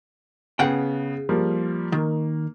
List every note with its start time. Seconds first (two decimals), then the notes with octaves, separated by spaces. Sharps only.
0.59 C#3 B3 G#4 F#5 G5
1.29 F3 G3 A#3
1.92 D#3 A#3